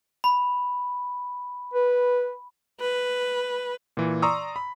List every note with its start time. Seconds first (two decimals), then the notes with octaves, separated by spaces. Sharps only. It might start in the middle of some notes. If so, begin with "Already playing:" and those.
0.24 B5
1.74 B4
2.80 B4
3.97 A#2 E3
4.22 D5 A#5 C6 C#6 D#6 E6
4.56 B5